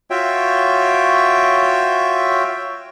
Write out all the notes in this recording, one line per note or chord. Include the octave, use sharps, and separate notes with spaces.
F4 F#4 C#5 E5 G5